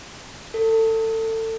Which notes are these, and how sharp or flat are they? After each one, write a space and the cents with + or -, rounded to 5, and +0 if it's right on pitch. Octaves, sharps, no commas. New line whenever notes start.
A4 +25